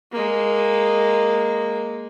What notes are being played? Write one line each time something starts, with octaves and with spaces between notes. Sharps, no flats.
G#3 A#3